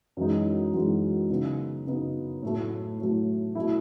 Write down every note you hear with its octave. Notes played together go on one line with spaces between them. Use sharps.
F#2 E3 G#3 D#4
F#2 E3 G#3 D#4
C#3 F#3 B3 D#4
C#3 F#3 B3 D#4
A2 F#3 A3
A2 F#3 A3
B2 A3 E4